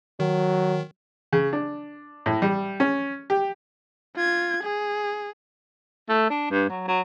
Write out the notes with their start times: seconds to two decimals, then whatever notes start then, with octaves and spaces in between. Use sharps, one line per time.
0.20 D#3 F#3
1.33 C#3
1.53 D4
2.26 A2
2.42 G3
2.80 C#4
3.30 G4
4.16 F4 G#6
4.63 G#4
6.09 A3
6.30 D4
6.51 G2
6.69 F#3
6.88 F#3